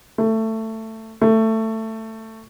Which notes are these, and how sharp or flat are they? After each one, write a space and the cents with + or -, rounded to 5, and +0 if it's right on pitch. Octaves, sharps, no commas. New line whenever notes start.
A3 +15
A3 +15